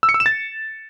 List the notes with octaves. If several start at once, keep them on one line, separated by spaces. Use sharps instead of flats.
E6
C#7
E6
E7
A6